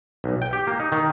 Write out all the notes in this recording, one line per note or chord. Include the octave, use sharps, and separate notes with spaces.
B1
G5
G4
A#3
D#4
D#3